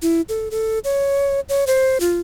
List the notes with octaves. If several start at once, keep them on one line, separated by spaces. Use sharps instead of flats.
E4
A4
A4
C#5
C#5
C5
F4